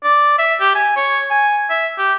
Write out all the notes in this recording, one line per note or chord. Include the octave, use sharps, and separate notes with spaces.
D5
E5
G4
G#5
C#5
G#5
E5
G4